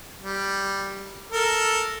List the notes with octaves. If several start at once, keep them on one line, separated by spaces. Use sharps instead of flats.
G3
A4 A#4